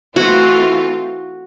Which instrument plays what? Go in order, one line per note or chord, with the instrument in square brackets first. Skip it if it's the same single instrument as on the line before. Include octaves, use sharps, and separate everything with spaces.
[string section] E3 A3 C4 F4 [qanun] F#4